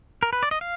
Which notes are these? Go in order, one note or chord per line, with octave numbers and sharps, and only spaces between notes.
A#4
B4
D5
D#5
F5